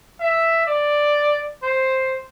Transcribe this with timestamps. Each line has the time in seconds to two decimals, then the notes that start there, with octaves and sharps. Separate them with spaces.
0.20 E5
0.66 D5
1.63 C5